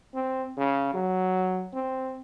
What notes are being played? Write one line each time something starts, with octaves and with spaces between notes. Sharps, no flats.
C4
C#3
F#3
C4